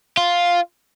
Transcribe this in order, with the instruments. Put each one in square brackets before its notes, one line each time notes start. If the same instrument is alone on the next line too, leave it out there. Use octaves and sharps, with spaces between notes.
[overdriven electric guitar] F4